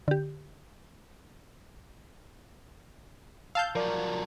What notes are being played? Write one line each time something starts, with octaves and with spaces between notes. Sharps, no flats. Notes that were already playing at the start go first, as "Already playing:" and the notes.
D3 G4
F5 A5 E6 G6
F3 F#3 A#4 D5